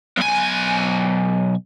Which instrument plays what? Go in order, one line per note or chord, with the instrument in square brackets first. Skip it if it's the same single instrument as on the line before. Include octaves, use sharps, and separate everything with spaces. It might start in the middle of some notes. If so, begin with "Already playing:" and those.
[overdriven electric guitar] B1 G#5